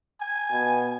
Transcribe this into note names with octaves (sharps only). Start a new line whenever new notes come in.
G#5
B2